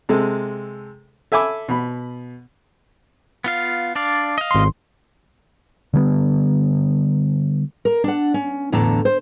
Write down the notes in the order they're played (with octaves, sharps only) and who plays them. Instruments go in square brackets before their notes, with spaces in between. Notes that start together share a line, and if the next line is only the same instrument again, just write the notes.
[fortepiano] C3 G#3 A4
A4 E5 G#5 B5 D6
B2 B5
[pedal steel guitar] B3 F4 F5
D4 D5 F5
D#5 F5
[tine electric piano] G#1 C6
[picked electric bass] D3 G3 B3
[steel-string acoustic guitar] A#4
D4 F#5
C#4
E2 A2 D3 A5 A#5
C5